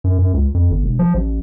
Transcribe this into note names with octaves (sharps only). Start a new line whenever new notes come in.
F#2
F#2
C#2
F2
G1
E1
F3
A1